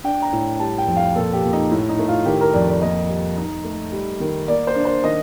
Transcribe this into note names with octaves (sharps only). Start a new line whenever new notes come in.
D4 G5
A#5
A2
G3 A5
G5
F2
F5
A#2 A4
G4
A#2
D#4
A2
D#4
A3
F4
D#3 G4
A#4
F2 D5
D5
A#3 D#5
G3
D#4
A3
G3
D#3
A#3 D5
C5
D4
C5
D#3 D#5